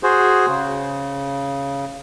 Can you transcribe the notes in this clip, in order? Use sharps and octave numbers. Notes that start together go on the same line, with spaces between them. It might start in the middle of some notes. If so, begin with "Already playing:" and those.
F#4 G#4 C5
C#3